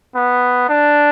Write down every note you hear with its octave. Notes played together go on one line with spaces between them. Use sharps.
B3
D4